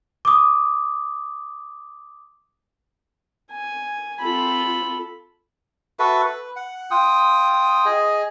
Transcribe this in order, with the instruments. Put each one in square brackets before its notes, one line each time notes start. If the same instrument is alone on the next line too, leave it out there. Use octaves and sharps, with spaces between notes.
[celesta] D6 D#6
[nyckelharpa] G#5
[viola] C4 F4 [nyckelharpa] A4 B5
[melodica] F#4 A4 B4 E5
B4
F#5
F4 G5 D#6
G#4 D#5